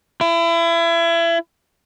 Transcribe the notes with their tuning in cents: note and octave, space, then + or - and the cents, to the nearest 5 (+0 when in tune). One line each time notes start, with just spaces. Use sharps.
E4 +30